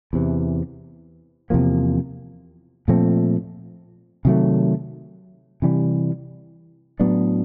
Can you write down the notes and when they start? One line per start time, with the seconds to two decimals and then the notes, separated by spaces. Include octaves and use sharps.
0.13 E2 C3 E3
1.50 E2 C3 F3 A#3
2.88 A#2 F3 A3 C4
4.25 C3 D#3 F#3 A3
5.62 C3 E3 G3
7.00 A2 F#3 B3 D4